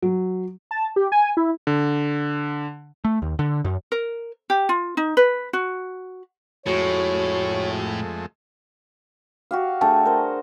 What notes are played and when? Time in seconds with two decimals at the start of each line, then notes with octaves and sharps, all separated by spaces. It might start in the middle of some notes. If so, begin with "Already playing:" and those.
0.02 F#3
0.71 A5
0.96 G4
1.12 G#5
1.37 E4
1.67 D3
3.05 A3
3.22 D#2
3.39 D3
3.65 F#2
3.92 A#4
4.50 G4
4.69 F4
4.97 D#4
5.17 B4
5.53 F#4
6.66 F2 A2 G#3 A3 F#4 C#5
9.51 F#4 G4 F5
9.81 A3 D4 G#4 G5 A5
10.05 A#4 C5